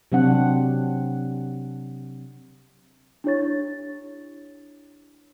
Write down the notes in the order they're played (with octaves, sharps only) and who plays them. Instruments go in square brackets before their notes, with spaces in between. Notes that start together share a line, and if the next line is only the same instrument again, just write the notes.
[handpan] C3 F#3 C4 D4 F#5
[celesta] D4 E4 G4 C#5 C#6 A6